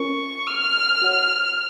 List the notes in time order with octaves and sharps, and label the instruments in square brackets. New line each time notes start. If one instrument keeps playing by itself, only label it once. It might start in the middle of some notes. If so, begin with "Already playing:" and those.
Already playing: [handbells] C#4 F4 A#4 [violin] C#6
[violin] F6
[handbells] F#4 C#5 F#5